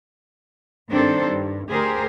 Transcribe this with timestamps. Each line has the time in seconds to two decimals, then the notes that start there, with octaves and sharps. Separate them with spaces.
0.90 G2 D#3 C4 D4 A4 C5
1.25 G2
1.68 D2 G4 G#4 A#4 C5